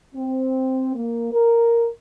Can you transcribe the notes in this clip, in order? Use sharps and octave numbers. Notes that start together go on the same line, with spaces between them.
C4
A#3
A#4